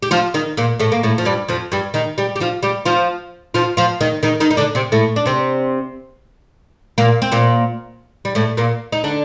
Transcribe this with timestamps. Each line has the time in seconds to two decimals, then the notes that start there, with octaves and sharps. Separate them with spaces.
0.03 G4
0.11 F3 F4
0.34 D#3 D#4
0.57 A#2 A#3
0.80 A2 A3
0.92 A#3
1.03 A2 A3
1.18 F3
1.25 G2 G3
1.48 F2 F3
1.72 G2 G3
1.94 D#3 D#4
2.18 G3 G4
2.36 G4
2.40 F3 F4
2.63 G3 G4
2.85 F3 F4
3.54 F3 F4
3.77 F3 F4
4.01 D#3 D#4
4.23 D#3 D#4
4.40 D#3 D#4
4.51 D#4
4.57 D3 D4
4.75 C3 C4
4.92 A2 A3
5.16 D4
5.26 C3 C4
6.98 A#2 A#3
7.22 C4
7.32 A#2 A#3
8.25 G3
8.35 A2 A3
8.57 A#2 A#3
8.92 D#4
9.04 D3 D4